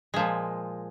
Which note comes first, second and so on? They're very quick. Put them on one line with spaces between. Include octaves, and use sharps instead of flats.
G#3 F3 A#2